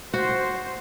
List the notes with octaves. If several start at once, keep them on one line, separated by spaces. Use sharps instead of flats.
F#4 C5